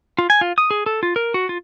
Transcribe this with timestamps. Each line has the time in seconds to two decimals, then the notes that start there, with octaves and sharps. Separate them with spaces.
0.19 F4
0.30 G#5
0.41 F4
0.58 D#6
0.71 G#4
0.86 A4
1.03 F4
1.16 A#4
1.34 F#4
1.49 F4